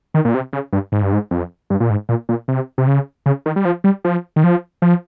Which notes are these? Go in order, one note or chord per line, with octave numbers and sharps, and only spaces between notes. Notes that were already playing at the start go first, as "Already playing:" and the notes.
D#3
A#2
C3
C#3
G2
G#2
G2
G#2
F2
G2
A#2
G#2
A#2
A#2
C3
C3
C#3
C#3
D#3
G3
F3
G3
F3
D#3
F3
F3